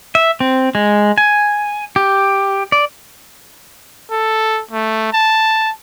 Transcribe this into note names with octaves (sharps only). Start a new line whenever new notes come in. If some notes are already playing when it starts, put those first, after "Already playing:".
E5
C4
G#3
G#5
G4
D5
A4
A3
A5